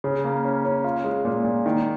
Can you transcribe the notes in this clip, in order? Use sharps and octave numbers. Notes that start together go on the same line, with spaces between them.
C#3
A#3
C#4
C#4
F4
G#3
A#2
A#2
D#3